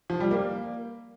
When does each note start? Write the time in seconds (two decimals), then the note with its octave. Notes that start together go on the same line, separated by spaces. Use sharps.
0.10 F3
0.20 G3
0.31 A#3